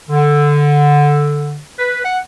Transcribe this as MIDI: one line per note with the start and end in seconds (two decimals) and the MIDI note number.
0.10 1.58 50
1.78 2.02 71
2.04 2.17 78